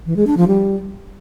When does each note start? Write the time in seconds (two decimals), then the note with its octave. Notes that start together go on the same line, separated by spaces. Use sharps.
0.06 E3
0.16 G#3
0.27 D4
0.37 F3
0.48 G3